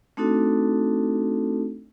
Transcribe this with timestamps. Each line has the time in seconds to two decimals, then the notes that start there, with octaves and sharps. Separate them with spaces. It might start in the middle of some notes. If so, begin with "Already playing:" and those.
0.17 A3 C4 D4 D#4 F#4 A4